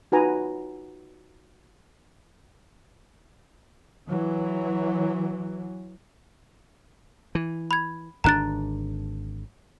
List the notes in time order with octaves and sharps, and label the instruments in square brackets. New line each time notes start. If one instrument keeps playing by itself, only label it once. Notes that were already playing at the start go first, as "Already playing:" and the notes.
[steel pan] D#4 F4 F#4 B4 G#5 A#5
[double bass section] E3 F#3
[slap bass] E3
[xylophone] B5 G#6
[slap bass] G#1 D3 D4 [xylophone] A#5 F#6 A6